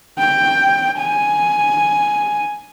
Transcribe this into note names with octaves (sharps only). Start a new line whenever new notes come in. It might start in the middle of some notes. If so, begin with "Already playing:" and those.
G5
G#5